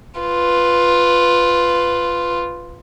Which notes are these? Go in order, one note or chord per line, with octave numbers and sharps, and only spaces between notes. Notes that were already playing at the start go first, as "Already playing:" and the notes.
F4 B4